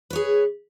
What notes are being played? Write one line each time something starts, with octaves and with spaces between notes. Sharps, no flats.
G#4 B4 C#5